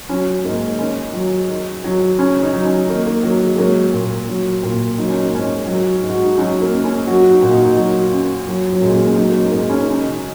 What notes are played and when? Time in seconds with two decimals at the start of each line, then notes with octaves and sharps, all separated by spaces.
0.09 F#3 C#4
0.44 G#2 A#3
0.79 D#3 C#4
1.14 F#3
1.50 D#3
1.84 F#3
2.18 C#3 C#4
2.37 C#4
2.42 D#4
2.54 F#3
2.65 C#4
2.89 D#3 A#3
3.05 A#3
3.23 F#3
3.42 G#3
3.54 G#3
3.58 F#3 A#3
3.93 A#2
4.28 F#3
4.63 A#2
4.98 F#3 D#4
5.10 C#4
5.23 A#3
5.33 G#2 C#4
5.67 F#3
6.03 G#2
6.10 F#4
6.24 D#4
6.38 F#3 C#4
6.61 A#3
6.73 F#2
6.84 C#4
7.07 F#3 F#4
7.31 D#4
7.42 A#2 F#4
7.54 D#4
7.77 F#3 F#4
8.12 F#2
8.47 F#3
8.73 F#3
8.82 A#2 G#3
8.95 A#3
9.06 C#4
9.16 F#3 D#4
9.29 A#3
9.34 C#4
9.44 G#3
9.51 G#2 A#3
9.70 C#4
9.80 D#4
9.87 C#3 C#4